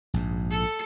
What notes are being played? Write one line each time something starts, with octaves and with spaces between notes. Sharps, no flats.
A#1 G#2
A4